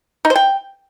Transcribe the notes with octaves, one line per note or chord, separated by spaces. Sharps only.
D#4
C5
G5